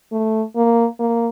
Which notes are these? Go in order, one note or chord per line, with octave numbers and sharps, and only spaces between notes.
A3
A#3
A#3